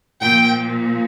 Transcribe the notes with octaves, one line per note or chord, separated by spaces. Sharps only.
A#2 F3 G5